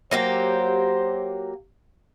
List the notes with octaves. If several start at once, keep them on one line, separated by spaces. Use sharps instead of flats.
F#3 A#3 G4 C5